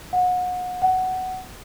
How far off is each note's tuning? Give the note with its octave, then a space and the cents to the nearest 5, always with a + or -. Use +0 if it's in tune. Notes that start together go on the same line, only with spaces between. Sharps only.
F#5 -30
F#5 +10